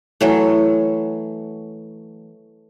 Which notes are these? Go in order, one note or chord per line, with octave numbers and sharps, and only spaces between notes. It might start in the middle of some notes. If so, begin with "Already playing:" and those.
E3 F#3 A3